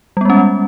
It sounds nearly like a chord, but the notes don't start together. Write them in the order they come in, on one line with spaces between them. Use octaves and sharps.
G3 B3 G#3 C#4